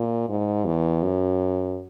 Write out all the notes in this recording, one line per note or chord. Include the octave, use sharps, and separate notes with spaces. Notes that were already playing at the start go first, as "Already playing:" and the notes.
Already playing: A#2
G#2
E2
F#2